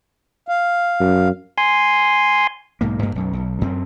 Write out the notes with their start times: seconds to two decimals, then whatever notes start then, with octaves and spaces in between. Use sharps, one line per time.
0.48 F5
1.00 F#2
1.58 G#5 C6
2.81 B1 G#2 A#3
3.02 G2 A#3
3.15 B1 F#2
3.33 B1
3.61 F#2 C4